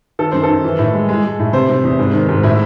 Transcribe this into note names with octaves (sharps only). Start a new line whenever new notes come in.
D#3 A4
F#2 C5
A4
D#3
E3
A2
G#3
G#3
G#3
A2
C3 C5
C3
E2
G#2
D#3
G#2
A2 E4